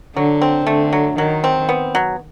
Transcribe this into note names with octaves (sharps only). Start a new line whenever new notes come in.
D3 F#3
C4
D3 A3
F#3
D#3 F#3
C4
B3
F#3